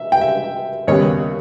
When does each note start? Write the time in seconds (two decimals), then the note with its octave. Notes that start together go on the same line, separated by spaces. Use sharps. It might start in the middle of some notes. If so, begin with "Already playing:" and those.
Already playing: E5
0.12 G5
0.21 E5
0.88 D#2 C#3 G3 B3 C#5